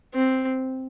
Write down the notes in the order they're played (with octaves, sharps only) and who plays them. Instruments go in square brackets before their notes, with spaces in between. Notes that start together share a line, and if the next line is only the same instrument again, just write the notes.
[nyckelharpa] C4